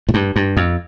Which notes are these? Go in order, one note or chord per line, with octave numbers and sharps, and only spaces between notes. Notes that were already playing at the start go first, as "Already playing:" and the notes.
A2
G2
G2
F2